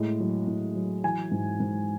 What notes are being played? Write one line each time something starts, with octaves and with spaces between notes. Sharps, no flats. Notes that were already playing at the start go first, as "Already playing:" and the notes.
Already playing: A2 G#3
F#3
A2
F#3
E3 G#5
G#2
G#2